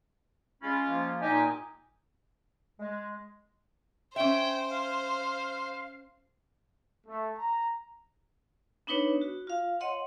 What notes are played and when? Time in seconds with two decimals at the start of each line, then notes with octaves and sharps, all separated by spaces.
0.62 G#3 C#4 F4 B5
0.87 F3 A#3
1.21 A#2 D#4 G4 D#5 G#5
2.79 G#3
4.16 C#4 C5 E5 G5
4.70 F5
7.07 A3
7.37 A#5
8.87 B3 D4 D#4 B4 C#5
9.21 F#4
9.47 F4 F5
9.80 C#5 D#5 F#5 C6